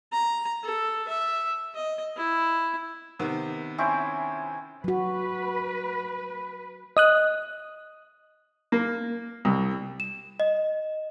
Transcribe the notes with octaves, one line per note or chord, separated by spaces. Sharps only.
A#5
A4
E5
D#5
E4
C3 D#3 B3
C4 C#4 E4
F#3 F#4 B4
D#5 D#6 F#6
A#3
C2
E7
D#5